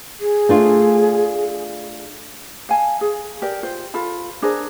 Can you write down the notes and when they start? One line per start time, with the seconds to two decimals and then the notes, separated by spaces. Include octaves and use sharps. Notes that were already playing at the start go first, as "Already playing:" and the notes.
0.20 G#4
0.49 A3 D4 F4
2.69 F5 G#5 A5
3.01 G#4
3.42 G4 A#4 D5
3.63 F4 C5
3.94 F4 A4 B5
4.42 D4 G#4 A#4 C5